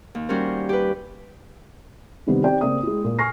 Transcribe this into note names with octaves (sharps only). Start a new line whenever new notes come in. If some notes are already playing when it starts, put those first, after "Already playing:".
D#2
G3 C#4 F#4 A#4 C5
G4 B4
C3 D#3 G3 B3 C4
C4 D#4 G4 D5 G5
C#3 A#3 C4 D5 D#6
G#3 E4
A#2
G#5 C#6 F6 A#6 C7